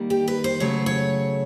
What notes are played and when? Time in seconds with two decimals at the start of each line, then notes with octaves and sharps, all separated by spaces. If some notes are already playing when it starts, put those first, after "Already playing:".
Already playing: D#3 G3 A#3
0.10 G4
0.28 B4
0.44 C5
0.60 C#3 F#3 A3 C#5
0.86 C#5